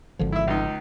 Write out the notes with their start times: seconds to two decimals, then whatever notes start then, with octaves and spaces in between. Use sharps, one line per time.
0.19 G#1 D3 F3
0.32 E4 E5
0.47 C#2 D#4